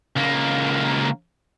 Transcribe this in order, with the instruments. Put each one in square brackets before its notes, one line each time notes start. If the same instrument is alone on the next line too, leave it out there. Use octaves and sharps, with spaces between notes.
[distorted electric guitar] C#2 A#3